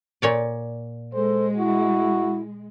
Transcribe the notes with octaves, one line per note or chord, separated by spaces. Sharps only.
A#2 C#5 D5
G#3 A4 C5
E4 F#4